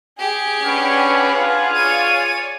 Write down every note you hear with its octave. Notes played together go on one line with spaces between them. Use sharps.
G4 G#4
C#4 D4 B4 F#5
F4 F5 G#5
C#5 D5 D#7